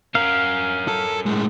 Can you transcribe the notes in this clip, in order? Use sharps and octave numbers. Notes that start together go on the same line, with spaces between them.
C#4 A#4 F5
A4
A2 G#3